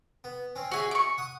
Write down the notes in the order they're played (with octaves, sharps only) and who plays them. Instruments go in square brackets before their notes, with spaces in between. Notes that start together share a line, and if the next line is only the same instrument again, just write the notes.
[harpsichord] B3
C4 C#4
[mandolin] F#4 G#4 [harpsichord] D#5 E5 G#5
[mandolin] C#6 D6
[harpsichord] F#5 D#6